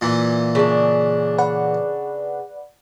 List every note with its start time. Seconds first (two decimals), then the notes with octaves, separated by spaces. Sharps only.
0.01 A#2 E3
0.55 C#3 D4
1.38 B4 D5 F#5